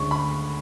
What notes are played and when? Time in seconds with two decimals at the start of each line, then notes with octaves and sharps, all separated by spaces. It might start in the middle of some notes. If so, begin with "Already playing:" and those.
Already playing: D2 D3 G#3 C#4 C#6
0.11 B5